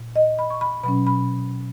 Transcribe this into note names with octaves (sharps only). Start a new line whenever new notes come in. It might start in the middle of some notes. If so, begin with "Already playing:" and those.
Already playing: A#2
D#5
B5
C#6
B5
B2 F#3 C#4 B5
B5